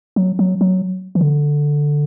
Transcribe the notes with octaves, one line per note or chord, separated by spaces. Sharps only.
F#3
F#3
F#3
E3
D3